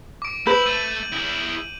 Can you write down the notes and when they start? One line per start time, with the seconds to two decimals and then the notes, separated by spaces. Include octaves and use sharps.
0.22 D6 D7
0.47 E4 B4 G6 F#7
0.66 A3 D#7
1.13 E4 G#4